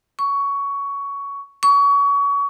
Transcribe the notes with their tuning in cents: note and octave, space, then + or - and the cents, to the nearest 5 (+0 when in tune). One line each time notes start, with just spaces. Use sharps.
C#6 +15
C#6 +30